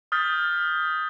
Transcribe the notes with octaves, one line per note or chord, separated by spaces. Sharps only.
D#6 F6 G6 A6 B6